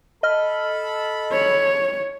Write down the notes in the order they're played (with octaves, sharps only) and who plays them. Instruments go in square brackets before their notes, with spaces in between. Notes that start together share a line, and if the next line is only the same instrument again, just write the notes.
[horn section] A4 B5 [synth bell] D#5 F6
[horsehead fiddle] C#5